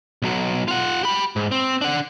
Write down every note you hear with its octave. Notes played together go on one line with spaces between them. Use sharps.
B1 F#3
F4 F#5
G4 B5
G#2
C4
D4 F#5